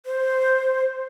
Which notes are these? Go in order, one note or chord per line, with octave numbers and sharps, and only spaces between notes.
C5